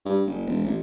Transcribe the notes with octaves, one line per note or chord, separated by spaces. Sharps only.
G2
F#1
E1
A1